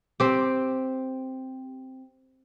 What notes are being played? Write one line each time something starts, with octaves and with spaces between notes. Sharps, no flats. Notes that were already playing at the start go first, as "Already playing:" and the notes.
C4 G4